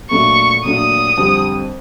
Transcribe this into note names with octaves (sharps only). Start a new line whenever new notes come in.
A#2 F#3 A3 D4 C#6
A#2 F#3 A3 D4 D#6
F2 D3 G3 C4